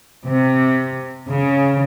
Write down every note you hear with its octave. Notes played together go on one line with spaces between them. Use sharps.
C3
C#3